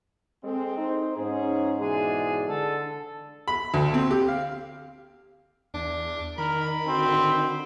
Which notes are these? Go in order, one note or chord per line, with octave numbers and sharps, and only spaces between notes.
G#3 C4 A4
D#4 C5
G#2 G#3 C#4 D#4 G#4
B2 E3 D4 G#4
D3 A4
B5
D2
C4
G4
F5
E2 D4
D#3 A#4 B5
D3 C4 F#4